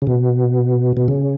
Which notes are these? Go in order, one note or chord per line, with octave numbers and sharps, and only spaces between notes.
C#3
B2
B2
C#3